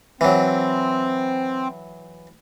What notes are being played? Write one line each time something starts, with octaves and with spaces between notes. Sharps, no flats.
E3 F#3 C4